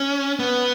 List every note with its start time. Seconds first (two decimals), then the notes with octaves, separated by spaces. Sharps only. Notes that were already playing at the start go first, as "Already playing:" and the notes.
Already playing: C#4
0.39 B3